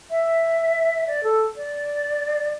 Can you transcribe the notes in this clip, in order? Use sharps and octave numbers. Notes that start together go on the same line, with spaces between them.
E5
D5
A4
D5